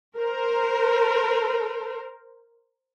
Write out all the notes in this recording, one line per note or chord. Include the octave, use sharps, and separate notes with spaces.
A#4 C5